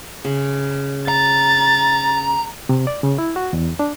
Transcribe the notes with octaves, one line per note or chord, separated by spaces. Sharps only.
C#3
A#5 A6
C3
D5
C#3
E4
F#4
E2
D4